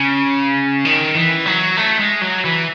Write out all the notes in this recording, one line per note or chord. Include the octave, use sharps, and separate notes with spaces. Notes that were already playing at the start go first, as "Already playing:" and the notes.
Already playing: C#3
D#3
E3
F#3
A3
G#3
F#3
E3